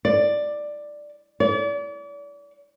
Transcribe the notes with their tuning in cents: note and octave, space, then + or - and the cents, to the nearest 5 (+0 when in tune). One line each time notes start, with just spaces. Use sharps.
D5 +10
D5 -40